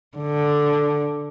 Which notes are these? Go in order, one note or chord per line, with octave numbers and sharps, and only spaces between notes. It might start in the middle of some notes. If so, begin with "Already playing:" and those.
D3